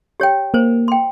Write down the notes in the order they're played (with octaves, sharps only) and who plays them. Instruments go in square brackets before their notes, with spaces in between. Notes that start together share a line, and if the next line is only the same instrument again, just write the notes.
[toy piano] G4 C#5 G5
[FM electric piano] A#3 [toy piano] C5
[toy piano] G5 C6